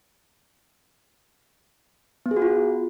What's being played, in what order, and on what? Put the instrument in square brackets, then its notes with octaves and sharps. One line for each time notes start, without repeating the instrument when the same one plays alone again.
[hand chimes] B3
G#4
F#4
F4